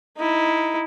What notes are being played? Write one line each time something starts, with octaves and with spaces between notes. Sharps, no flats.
D#4 E4